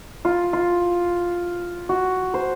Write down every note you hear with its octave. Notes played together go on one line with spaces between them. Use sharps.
F4
F4
F#4
C5